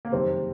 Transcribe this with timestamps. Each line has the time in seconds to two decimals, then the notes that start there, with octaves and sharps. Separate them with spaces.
0.05 A#3
0.12 F#1 F2 C3 D#3 C4